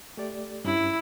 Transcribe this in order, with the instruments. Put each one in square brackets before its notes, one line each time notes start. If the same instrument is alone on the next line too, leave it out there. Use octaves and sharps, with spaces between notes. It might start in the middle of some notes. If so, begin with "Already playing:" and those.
[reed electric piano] A3 G4 D5
[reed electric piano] G2 C#4 [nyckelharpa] E4